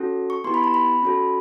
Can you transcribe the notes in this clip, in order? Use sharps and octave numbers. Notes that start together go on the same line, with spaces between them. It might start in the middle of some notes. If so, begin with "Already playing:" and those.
Already playing: C#4 F#4 A4
C#6
B3 E4 G4 C6
B5
A#5
B5
C#4 F#4 A4